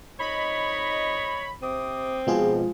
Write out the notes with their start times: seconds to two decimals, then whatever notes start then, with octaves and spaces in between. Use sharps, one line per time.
0.20 F2 D#4 C#5 D#5 B5
1.62 C3 C4 D6 D#6
2.27 G#2 B2 F3 G#3 F4 G#4